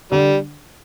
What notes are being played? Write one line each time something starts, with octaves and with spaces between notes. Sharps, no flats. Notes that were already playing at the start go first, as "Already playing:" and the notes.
D3 G3